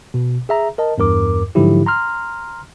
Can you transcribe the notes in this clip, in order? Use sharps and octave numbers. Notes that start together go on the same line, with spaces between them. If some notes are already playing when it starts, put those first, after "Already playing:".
B2
G#4 E5 A#5
A#4 D#5 A5
E2 G2 A#4 D6
G#2 D3 F3 F#3 E4 G4
A#5 C6 F6